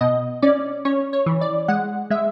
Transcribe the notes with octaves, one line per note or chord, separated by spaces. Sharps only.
B2 D#5
C#4 D5
C#4 C#5
C#5
E3
D5
G#3 F#5
G#3 E5